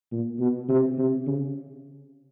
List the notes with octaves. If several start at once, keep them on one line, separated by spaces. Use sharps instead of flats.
A#2
B2
C3
C3
C#3